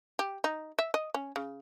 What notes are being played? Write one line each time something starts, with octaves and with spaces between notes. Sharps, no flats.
G4
D#4
E5
D#5
C#4
C#3